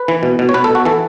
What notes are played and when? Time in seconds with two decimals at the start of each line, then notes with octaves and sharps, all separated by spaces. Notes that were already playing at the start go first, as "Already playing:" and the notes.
Already playing: B4
0.08 E3
0.23 B2
0.39 B2
0.49 C#5
0.54 B2 B4
0.64 A4
0.70 B2
0.75 F#4
0.85 E3 A4